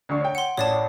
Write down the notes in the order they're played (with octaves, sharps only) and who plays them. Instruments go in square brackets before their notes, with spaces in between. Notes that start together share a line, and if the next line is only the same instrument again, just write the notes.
[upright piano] D2 D3 C#6
C#5 G5
[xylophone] F#5 C6
[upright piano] A1 A2 [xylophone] C#5 D5 A5